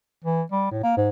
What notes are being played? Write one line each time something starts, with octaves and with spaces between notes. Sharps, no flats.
E3
G3
A2
A#3
G#2